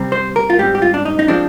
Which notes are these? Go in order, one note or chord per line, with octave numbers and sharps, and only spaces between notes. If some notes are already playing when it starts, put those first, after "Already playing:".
Already playing: C3 G3 C4
C5
A#4
F4
G#2 G3 C4 G4
G4
F4
D4
D#4
D#4
F3 G#3 C4 D4